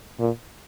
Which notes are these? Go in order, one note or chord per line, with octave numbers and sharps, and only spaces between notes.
A#2